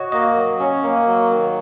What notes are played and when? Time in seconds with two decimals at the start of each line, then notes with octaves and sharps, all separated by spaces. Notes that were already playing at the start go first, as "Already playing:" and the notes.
Already playing: F#4 C#5 D#5
0.12 A#3 D#5
0.36 F#3
0.59 C#4
0.82 A#3
1.07 F#3
1.31 D#3